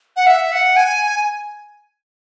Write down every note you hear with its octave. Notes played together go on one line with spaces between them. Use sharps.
F#5
E5
F#5
G#5